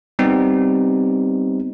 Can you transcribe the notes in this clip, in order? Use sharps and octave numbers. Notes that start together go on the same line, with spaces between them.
G3 B3 C4 D#4 G4